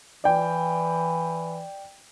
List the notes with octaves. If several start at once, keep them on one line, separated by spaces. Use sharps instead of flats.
E3 D5 G5